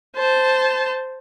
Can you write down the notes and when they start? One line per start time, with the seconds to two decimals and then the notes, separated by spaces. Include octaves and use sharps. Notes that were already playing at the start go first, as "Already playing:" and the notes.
0.16 C5 A5